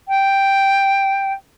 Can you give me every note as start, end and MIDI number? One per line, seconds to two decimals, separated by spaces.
0.08 1.33 79